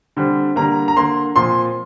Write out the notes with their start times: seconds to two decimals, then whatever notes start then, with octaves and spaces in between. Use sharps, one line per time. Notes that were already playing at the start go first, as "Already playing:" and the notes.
0.17 D3 G3 C4
0.56 D3 G3 A#3 A#5
0.88 A#5
0.97 D3 A#3 C6
1.36 A#2 F3 C4 C6